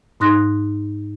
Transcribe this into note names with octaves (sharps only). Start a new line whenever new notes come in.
G#2 D#4 C6 D#6 F#6 A#6